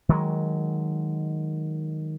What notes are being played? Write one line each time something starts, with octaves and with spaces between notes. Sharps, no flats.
D#3 F#3 G#3